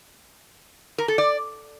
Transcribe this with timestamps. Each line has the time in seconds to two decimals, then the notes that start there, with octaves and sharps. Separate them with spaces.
0.98 A#4
1.08 A4
1.18 D5